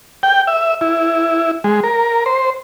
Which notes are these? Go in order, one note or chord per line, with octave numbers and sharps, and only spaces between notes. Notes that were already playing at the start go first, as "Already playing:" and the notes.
G5
E5
E4
G#3
A#4
C5